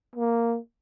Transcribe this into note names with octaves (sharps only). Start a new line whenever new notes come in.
A#3